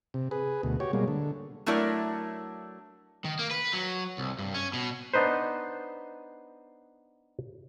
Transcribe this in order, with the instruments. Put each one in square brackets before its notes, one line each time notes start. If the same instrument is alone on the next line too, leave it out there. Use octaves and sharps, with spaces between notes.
[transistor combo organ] C3
G#4 B4
D2 B2
F#4 G4 C#5
B2 G3 G#3 A#3
D3
[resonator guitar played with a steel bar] F#3 A3 D4 E4 A#4
[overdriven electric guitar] D#3
A#3
B4
F#3
C2
G2
C#4
B2
[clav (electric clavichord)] B3 D4 D#4 B4 C5